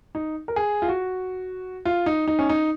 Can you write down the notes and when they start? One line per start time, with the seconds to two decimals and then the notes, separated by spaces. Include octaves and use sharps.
0.15 D#4
0.48 A#4
0.56 G#4
0.82 F4
0.88 F#4
1.85 F4
2.06 D#4
2.28 D#4
2.39 C#4
2.49 D#4